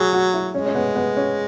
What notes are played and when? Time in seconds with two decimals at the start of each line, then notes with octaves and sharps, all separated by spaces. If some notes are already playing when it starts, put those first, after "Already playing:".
Already playing: F#3 G#4
0.13 F#4
0.34 E4
0.54 G#3 C#4
0.66 C#4
0.75 B3
0.95 B3
1.17 C#4